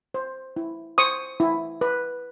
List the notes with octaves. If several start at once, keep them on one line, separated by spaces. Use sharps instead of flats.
C5
E4
C5 C#6 D#6
E4
B4